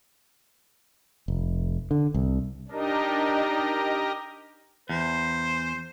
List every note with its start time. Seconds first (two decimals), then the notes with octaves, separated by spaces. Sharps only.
1.28 F1
1.91 D3
2.14 C2
2.72 D4 D#4 G4 A#4 D#5
4.89 E2 C5